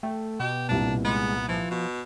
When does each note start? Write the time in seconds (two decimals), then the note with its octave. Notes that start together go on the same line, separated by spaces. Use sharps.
0.03 A3 G5
0.40 B2 G4
0.69 C2 A#2 D4
1.05 G#3 B3
1.49 E3 F3
1.71 B2